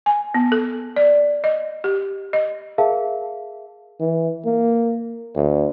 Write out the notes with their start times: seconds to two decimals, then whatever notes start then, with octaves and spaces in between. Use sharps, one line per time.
0.06 G#5
0.34 B3
0.52 A4
0.96 D5
1.44 D#5
1.84 G4
2.33 D#5
2.78 G#4 A#4 E5 F5 A5
4.00 E3
4.45 A#3
5.35 D2